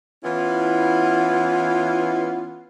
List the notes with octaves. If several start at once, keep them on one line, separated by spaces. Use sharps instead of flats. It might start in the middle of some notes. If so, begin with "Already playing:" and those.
E3 B3 C#4 E4 F4